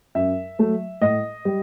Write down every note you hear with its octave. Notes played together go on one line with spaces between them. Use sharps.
F#2 E5
F#3 A3
A2 D#5
G3